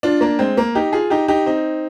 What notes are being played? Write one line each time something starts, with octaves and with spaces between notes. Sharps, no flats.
D4 F4
A#3 D4
G#3 C4
A#3
D#4 G4
F4 G#4
D#4 G4
D#4 G4
C4 D#4